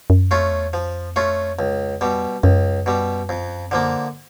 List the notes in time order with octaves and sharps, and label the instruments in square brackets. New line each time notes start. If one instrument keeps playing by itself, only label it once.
[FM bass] F#2
[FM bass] F2 [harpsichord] A3 C#4 F4
[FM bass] E2
[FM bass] F2 [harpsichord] F3
[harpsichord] A3 C#4 F4
C#2
B2 G3
[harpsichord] C#2 [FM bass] F#2
[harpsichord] B2 G3
F2
D3 F3 A#3